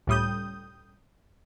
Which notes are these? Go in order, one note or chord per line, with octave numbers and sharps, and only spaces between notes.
C#2 A2 G3 D#6 G6